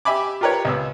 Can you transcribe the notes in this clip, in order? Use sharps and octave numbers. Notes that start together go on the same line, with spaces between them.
G4 E5 G#5 B5 D6
F4 G4 A#4 B4 C#5
C#2 B3 E6